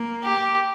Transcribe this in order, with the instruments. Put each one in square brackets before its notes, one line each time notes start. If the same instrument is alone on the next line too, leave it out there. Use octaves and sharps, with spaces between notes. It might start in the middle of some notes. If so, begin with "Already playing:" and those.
Already playing: [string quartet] A#3
[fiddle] G4